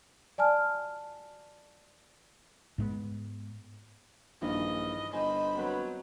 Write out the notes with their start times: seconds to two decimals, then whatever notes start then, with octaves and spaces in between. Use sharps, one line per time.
0.38 D5 G#5 A5 F6
2.78 G#2 G#3 B3
4.42 A#1 G2 D#3 E3 D#5
5.13 G1 C5 D#5 G#5 B5
5.56 F#3 B3 C4 B4